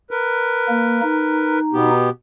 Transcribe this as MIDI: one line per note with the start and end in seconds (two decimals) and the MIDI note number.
0.11 1.59 70
0.11 1.59 71
0.68 1.01 58
1.02 1.91 63
1.73 2.09 47
1.73 2.09 59
1.73 2.09 67